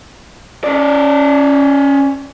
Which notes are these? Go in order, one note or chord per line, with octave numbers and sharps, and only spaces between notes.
C#4 D5